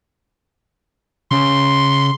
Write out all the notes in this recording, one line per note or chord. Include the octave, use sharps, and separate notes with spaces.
C#3 C6